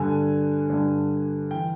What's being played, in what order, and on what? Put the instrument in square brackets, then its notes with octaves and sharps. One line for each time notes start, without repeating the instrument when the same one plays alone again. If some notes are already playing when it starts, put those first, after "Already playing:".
Already playing: [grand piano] G2 D3 G#5
G2 D3
E3 G5